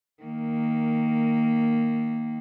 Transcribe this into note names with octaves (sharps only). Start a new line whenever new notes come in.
D#3 A#3